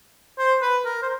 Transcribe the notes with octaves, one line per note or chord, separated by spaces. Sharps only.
C5
B4
A#4
C5